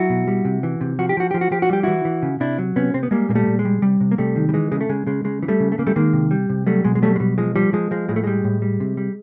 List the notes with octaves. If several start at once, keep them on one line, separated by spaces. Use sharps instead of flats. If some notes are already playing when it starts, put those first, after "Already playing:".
Already playing: F#3 E4 F#4
B2
G3
C3
E3
C3
F3 F#4
G4
F3 F#4
F3 G4
F#4
F3 G4
F#4
G3 G4
E3 E4 F#4
E3
C#3
C3 D4 E4
F#3
C3 B3 C#4
C3 C4
B3
G3 G#3 A#3
A#2 A#3
G3 A3
A#2
G#3
G3
C3 G3
C3
A#3
C3 G3 A3
D#3
G3
E3 G#3
C#3 G#3
A3
C#3 G#3
C#3 G#3
C#3 G#3
E3
G3 A3
C#3
A3
C#3 A#3
G3 A3
D#3 G#3 A#3
C3
G3
C3
F#3 G3 A3
B2 G#3
G#3
F#3 G3 A3
G#3
B2 G3
F3 G#3
F3 G3
F3 G#3
F3 G#3
A2 G#3
A3
G3 G#3
A2
G3
C3
G3